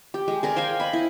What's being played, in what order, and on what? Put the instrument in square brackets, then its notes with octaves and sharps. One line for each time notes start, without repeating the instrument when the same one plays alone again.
[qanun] G4
G#3
G#4 A#4 D5
C5 F5 G5 G#5
D#5 B5
E4